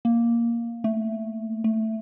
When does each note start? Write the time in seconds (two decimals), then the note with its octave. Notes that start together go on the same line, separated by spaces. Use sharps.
0.05 A#3
0.84 A3
1.64 A3